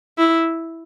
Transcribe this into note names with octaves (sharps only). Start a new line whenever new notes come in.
E4